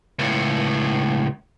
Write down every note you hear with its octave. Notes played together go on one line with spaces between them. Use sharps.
C#2 A2